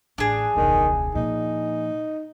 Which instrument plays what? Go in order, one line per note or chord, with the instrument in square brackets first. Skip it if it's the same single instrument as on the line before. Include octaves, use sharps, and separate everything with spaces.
[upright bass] A1 [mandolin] D4 G#4
[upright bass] E1 C#2 [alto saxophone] D#3
[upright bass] A#2 F3 [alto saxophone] D#4